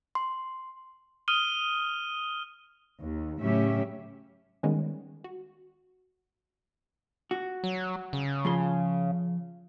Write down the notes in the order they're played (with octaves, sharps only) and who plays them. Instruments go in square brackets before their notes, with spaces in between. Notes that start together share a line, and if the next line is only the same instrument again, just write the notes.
[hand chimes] C6
[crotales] D#6 F6 D#7 G7
[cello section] D#2
A2 C#3 F#3 C#4 G4 E5
[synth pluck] D#3 G3 G#3 B3 C#4
F#4
[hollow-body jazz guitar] F#4
[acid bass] F#3
C#3
[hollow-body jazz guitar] F3 G#4 C6